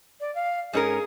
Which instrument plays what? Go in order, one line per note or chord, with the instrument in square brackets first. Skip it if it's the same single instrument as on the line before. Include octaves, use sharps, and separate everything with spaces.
[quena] D5
F5
[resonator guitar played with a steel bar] G#2 C#4 A#4 [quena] G#4